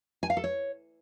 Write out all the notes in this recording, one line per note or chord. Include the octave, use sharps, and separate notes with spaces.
G#5
F5
A4
C#5